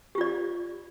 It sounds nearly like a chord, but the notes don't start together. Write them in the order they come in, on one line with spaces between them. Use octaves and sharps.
G4 F4 D5